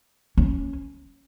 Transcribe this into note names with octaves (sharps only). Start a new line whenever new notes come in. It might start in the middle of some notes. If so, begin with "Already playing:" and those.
C#4